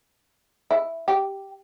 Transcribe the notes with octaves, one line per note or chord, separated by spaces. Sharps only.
E4
G4